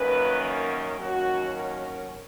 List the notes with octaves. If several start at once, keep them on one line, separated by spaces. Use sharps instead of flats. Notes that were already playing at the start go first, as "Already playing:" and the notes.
Already playing: F#2 D#3 A#3 C#4 B4
A#4
D#2 D#3 F#3 C#4 F#4
A#4